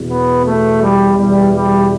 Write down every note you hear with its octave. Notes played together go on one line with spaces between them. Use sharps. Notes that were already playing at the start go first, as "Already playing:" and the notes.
Already playing: E2 B2
B3
A3
G3
E2 B2 G3
G3